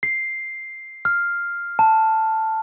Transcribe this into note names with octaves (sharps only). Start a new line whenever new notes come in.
C7
F6
A5